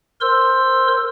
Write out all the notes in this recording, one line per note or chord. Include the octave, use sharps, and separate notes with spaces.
A#4 C5 C6 E6